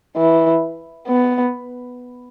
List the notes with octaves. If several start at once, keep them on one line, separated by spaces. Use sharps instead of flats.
E3
B3